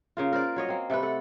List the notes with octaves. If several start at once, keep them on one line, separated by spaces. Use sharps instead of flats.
C#3 A#3 F4
A#4 C5 D5 F5
F#3 C#5 D#5
A#3 C4
C3 A3 A4 B4
A4 F#5